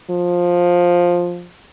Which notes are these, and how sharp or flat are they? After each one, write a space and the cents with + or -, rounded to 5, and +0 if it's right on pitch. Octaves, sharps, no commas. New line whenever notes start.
F3 +10